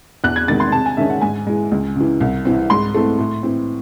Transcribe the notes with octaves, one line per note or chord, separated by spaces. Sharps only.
E2 F#6
G#6
C3 D#3 G#3 A6
C6
C3 A5
G#5
D#3 G#3 C#4 E5
F#5
G#2 G#5
E3 G#3
C#2
C#3 E3
C2
C3 E3 C4
G#2 C6
E3 A3 C4
A2
E3 C4